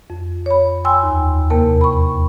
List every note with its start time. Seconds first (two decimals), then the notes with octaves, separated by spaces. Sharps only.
0.10 F2
0.46 C#5 B5
0.85 G5 G#5 C6 E6
1.03 D#2
1.50 E2 C3 A#3 A#4 G5 A5
1.81 B5 C#6